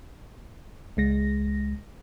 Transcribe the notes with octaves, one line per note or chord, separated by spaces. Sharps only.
C#2 G#3 A#6